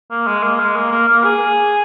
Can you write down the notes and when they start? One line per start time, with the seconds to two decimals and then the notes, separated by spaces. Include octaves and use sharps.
0.11 A#3
0.27 G#3
0.43 A#3
0.60 G#3
0.76 A#3
0.92 A#3
1.08 A#3
1.24 G#4